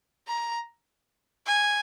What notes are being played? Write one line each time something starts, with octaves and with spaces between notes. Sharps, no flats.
A#5
G#5